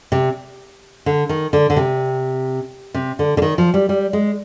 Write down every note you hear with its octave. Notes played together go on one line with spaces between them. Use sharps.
C3
D3
D#3
D3
D3
C3
C3
D3
D3
D#3
F3
G3
G3
G#3